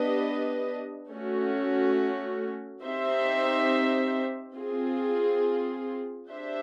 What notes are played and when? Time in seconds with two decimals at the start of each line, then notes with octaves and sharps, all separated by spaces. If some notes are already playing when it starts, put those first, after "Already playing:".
Already playing: B3 D4 G4 B4 D#5
1.08 A3 C#4 F#4
2.81 C4 D#4 G4 C5 E5
4.54 C4 F4 G#4
6.28 D4 G4 C5 E5